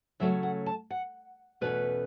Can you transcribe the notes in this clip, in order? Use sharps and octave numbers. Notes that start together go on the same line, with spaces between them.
C#3 F#3 A3 C#4 E5
F#5
A5
F#5
E2 B2 A3 C#4 B4